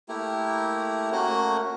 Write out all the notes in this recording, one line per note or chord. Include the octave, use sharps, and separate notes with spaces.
A3 A#3 E4 G4
A3 A#3 C#4 F#4